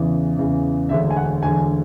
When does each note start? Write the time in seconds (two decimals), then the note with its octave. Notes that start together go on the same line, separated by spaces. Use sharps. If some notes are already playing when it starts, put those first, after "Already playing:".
Already playing: E2 C#3 E3
0.36 E2 C#3 E3
0.89 E1 D2 D3 E5
1.10 G#5
1.16 F#5
1.43 E1 D2 D3 G#5